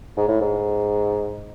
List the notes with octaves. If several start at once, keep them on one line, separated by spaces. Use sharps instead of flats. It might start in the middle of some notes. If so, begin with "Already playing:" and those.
G#2
A2
G#2